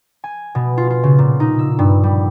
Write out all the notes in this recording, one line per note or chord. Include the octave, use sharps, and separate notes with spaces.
G#5
B2
F4
F4
C#3
A#2
D#4
E6
G2
G3